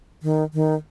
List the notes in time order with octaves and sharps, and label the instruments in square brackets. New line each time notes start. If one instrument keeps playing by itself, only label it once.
[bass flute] D#3
D#3